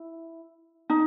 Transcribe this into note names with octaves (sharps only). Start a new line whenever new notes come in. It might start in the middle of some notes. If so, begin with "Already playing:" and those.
Already playing: E4
D#4